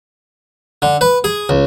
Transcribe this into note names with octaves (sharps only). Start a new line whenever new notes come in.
D3
B4
G#4
C#2